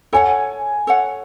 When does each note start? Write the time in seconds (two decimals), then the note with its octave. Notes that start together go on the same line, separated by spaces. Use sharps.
0.13 A4 C#5 F#5 G#5
0.87 A4 C#5 F#5